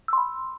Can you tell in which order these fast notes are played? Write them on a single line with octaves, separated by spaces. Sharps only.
E6 C6 B5